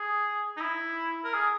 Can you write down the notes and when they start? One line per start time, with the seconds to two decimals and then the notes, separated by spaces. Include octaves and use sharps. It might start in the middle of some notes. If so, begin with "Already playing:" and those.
Already playing: G#4
0.57 D#4
0.61 E4
1.24 A#4
1.34 G#4